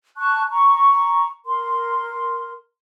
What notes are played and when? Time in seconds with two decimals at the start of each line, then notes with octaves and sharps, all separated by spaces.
0.17 A5 C#6 F#6
0.51 A#5 C#6
1.46 A#4 C6